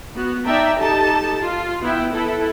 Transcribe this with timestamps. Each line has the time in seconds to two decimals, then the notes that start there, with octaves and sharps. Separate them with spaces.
0.14 B3 F#4
0.45 D#4 D5 E5 G5 A5 A#5
0.78 D#4 G4 A4 D#5 A5
1.40 F4
1.83 B3 E4 G5
2.13 E4 A4 B4